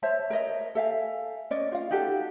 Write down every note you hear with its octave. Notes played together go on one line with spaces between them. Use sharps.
C5 C#5 E5 A5
A#4 C#5 D#5 E5
A4 E5 F5 G#5
C#4 D5 D#5
F4 F5
D#4 F#4 G4 A4